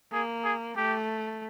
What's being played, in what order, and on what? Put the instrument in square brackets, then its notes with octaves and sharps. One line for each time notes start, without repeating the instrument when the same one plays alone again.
[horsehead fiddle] A#3 [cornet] G#4
[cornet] G#4
[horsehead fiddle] A3 [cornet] G4